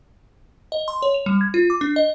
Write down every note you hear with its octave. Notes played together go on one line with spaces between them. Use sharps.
D#5
C6
C#5
F7
G3
G#6
F4
D6
D4
D#5